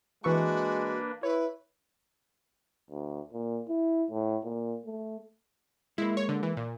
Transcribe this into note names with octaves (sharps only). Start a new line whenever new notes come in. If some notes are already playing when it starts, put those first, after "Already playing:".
E3 G#3 A#3 D4 F#4 B4 E5 C#6
E4 B4 C#5
D2
A#2
E4
A2
A#2
A3
G#3 A#3 E4
C#5
D3
E3
A#2